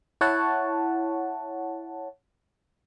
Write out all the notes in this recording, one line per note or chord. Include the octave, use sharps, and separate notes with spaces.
E4 C#5 F#5 A5